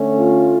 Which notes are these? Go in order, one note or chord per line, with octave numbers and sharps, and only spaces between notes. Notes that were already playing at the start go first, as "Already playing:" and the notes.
Already playing: D3 A3 C#4
F4